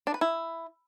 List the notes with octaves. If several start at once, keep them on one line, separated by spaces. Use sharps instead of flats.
D4
B4
E4